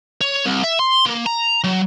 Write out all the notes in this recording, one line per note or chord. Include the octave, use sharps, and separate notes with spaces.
C#5
C2
E5
C6
A#3
A#5
F#3